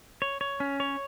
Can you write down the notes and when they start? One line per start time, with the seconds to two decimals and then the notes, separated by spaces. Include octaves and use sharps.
0.22 C#5
0.41 C#5
0.60 C#4
0.80 C#5